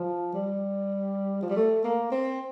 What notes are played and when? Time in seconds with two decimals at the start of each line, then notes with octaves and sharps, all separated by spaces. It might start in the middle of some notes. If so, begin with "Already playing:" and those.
Already playing: F3
0.34 G3
1.42 F3
1.49 G3
1.56 A3
1.84 A#3
2.12 C4